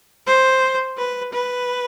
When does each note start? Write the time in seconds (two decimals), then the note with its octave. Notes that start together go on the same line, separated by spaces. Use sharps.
0.26 C5
0.97 B4
1.32 B4